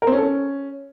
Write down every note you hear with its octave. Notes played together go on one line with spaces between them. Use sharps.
A#4
C4
C#4
A4
C#4